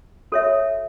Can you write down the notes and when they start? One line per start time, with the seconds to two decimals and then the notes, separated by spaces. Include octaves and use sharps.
0.32 F#4 A4 C#5 E5